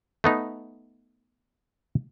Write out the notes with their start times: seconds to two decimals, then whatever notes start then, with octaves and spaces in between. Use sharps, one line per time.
0.24 A3 B3 D#4